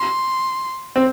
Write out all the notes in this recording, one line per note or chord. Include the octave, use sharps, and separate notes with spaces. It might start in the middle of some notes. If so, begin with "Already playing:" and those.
Already playing: C6
C4